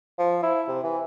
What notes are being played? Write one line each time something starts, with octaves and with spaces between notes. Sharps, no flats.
F3
E4
C3
E3